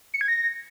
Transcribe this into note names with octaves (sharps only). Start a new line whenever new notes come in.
C#7
G#6
A#6